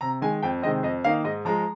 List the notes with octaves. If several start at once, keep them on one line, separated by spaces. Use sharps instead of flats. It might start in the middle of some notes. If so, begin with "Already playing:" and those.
C3 A#5
D#3 G#3 G#5
F2 G5
C3 D#3 G#3 C4 D#5
F2 D#5
D#3 A#3 D#4 F5
G#2 D#5
F3 G#3 A#5